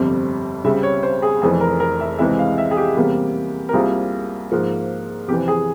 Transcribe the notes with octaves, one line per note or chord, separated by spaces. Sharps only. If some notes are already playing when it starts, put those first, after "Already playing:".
Already playing: G1 F2 C3 G3
C#2 C#3 G3 C4 E5
C#5
C5
G#4
F1 F2 E3 G#4
A#4
A#4
E5
C#2 C3 E3 G#3 E4 E5
F5
E5
G#4
G4
E2 C3 G3 A#3
A#4
C2 C3 G3 A#3 F4 G#4
G#2 F3 A#3
F2 C3 E3 G4
G#4